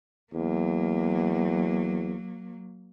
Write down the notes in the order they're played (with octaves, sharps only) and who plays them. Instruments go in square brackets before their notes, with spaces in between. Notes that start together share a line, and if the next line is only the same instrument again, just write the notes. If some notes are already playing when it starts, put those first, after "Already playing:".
[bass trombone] E2 [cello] F#3 A#3